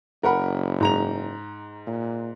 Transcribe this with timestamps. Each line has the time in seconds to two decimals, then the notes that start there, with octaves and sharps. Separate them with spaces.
0.23 F#1 A#4 F#5 B5
0.80 G#2 A#5 F7
1.87 A#2